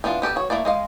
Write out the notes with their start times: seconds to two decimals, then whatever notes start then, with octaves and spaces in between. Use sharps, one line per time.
0.04 E3 B3 D4 F4
0.22 B3 G4 A4 B4
0.36 F#4 C#5
0.50 A3 A#3 E4 D5
0.65 G#3 D#5 F5